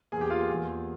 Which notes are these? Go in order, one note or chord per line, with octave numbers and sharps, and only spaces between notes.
E2 E3 A#3 G#4 G#5
G4 G5
F4 F5
E2 E3 A#3